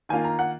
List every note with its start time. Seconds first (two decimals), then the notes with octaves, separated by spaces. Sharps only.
0.09 D#3 A#3 F4 G#5
0.24 A#5
0.39 F#5